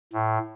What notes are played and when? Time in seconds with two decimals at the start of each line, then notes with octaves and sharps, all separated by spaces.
0.13 A2